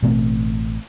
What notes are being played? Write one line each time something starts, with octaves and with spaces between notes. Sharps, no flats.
A1 B2 A3 C4